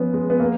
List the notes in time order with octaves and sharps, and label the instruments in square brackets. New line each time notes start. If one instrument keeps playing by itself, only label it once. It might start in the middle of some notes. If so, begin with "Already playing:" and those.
Already playing: [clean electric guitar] F3 [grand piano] B3 C#4
[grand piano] G#3
B3
A#3